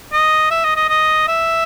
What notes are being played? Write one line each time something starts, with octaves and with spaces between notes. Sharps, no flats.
D#5
E5
D#5
D#5
D#5
E5